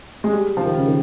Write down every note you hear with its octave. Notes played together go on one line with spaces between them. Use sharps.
G#3
G3
F3
D#3
C#3
D#3